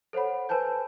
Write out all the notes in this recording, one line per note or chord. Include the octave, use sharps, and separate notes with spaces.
A4 C5 C#5 F#5 B5
B4 C5 G#5 A5 G6